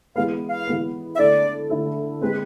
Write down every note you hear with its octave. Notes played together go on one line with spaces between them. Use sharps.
E3 G#3 B3 F5
F5
E3 G#3 B3
E5
D3 A3 E4 A4 D5
D3 A3 E4 A4
G#3 C4 B4